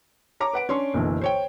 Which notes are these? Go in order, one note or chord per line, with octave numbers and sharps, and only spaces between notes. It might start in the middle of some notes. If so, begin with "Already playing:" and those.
C#5 A#5 D6
B4 F#5 D7
C#4 D4 C6 C#6
F#1 B1 D3 E3
C5 C#5 G5